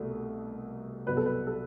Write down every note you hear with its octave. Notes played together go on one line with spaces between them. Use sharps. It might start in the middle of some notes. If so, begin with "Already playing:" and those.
Already playing: C2 B2 A3
C2 B2 F#3 B4
A4
B4
A4